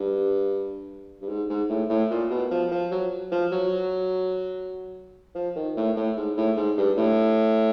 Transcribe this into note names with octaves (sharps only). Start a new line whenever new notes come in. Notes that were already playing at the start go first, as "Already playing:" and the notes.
Already playing: G2
G2
G#2
G#2
A2
A2
A#2
B2
F3
F3
F#3
F3
F#3
F3
D#3
A2
A2
G#2
A2
G#2
G2
A2